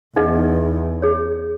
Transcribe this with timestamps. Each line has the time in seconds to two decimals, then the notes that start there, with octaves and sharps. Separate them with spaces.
0.16 E2 D#4 G#4 B4 D#5 F#5
1.02 G#4 C#5